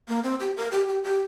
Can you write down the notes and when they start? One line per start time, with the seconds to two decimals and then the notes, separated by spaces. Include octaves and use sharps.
0.08 A#3
0.23 C4
0.40 G4
0.57 A#4
0.71 G4
0.88 G4
1.04 G4